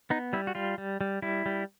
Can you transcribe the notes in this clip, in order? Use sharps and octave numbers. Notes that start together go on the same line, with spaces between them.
B3 D#4
G3 E4
F#4
G3 F4
G3
G3
G3 E4
G3